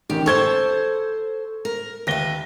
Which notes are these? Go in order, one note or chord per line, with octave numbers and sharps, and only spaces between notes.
A1 D#3 G4
A4 C5 A5 C#6 G#6 G7
A#4
D#2 B4 E5 A#6 G7